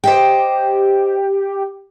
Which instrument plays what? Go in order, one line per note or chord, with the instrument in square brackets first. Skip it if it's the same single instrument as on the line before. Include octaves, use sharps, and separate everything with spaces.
[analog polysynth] G4 [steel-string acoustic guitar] C5 D#5 G5